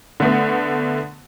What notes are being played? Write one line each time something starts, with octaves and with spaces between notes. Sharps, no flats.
D3 A3 B3